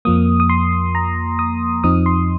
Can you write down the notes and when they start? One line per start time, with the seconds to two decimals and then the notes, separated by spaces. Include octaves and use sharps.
0.05 F2 F3 A#3 D#6
0.40 D#6
0.49 C6
0.95 A#5
1.39 D#6
1.84 F2 F3 C4 D#4 D#6
2.06 C6